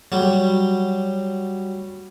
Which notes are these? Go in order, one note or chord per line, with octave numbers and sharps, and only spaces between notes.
F#3 G3